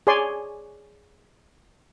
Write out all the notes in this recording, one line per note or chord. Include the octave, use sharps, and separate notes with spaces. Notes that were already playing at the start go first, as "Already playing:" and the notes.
G#4 C#5 D5 G#5 C6